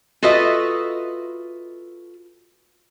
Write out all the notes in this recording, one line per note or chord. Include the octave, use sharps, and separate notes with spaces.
F4 F#4 A4 B4 D#5 E5